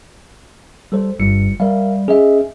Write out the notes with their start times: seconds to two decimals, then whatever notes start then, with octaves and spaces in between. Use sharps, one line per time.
0.92 G3 A4 C5
1.20 G1 G2 G3 C#7
1.60 G3 A#4 E5 F5
2.08 C#4 G#4 D#5 E5